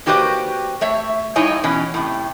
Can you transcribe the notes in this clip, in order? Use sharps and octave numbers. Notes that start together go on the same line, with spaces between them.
A#3 F#4 G4 B4 C5 D5
A3 C#5 E5
G2 D#4 E4 C#5 D#5 G#5
B2 E3 C#4
A2 C3